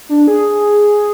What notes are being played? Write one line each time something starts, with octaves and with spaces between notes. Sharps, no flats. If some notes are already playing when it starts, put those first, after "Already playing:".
D4
G#4